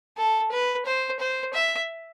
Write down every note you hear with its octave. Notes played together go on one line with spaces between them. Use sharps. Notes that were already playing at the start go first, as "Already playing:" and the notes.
A4
B4
C5
C5
E5